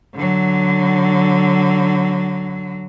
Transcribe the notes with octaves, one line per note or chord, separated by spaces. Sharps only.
D3 F#3